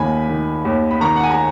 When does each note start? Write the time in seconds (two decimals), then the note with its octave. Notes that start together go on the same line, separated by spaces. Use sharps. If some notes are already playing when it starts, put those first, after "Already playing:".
Already playing: D#2 D#3 G#5 B5
0.29 D#3
0.65 D#2
0.91 B5
1.01 D#3 A#5 C#6
1.16 F#5
1.23 G#5
1.31 A#5